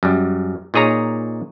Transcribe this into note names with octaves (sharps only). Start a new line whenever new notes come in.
F#2 G3
A#2 D#4 G#4 C#5 A#5